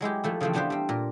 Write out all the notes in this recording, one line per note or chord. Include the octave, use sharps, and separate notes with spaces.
F#3 G#3 E4 G4
F3 A3 E4
C#3 E3 F3 A3 C4
E3 B3 D4 G4 B4 C5
G3 C4
A#2 A#4